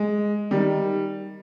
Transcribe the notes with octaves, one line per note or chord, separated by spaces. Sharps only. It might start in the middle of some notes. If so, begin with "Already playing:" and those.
Already playing: G#3
D#3 G3